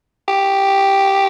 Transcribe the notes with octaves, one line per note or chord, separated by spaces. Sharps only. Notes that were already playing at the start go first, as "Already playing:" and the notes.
G4